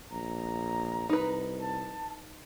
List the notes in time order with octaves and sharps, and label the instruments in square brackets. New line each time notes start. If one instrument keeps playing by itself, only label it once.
[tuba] A#1 [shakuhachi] A#5
[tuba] C2 [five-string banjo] D#4 B4
[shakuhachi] A5